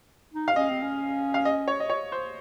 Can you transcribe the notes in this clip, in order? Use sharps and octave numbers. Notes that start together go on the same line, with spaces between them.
D#4
F5
C#4 D#5
C4
C#4
F5
D#5
C#5
D#5
C#5
C5